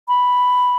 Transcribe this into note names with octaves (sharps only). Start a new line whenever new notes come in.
B5